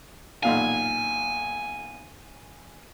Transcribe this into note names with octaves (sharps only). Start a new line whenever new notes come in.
B1 A#2 F5 G#5